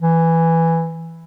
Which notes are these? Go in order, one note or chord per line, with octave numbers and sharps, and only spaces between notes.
E3